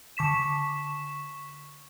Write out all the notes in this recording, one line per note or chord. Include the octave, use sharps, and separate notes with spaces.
D3 C#6 B6 E7